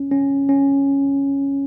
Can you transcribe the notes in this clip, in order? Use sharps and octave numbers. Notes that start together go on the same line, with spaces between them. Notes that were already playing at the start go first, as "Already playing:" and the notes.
Already playing: C#4
C#4
C#4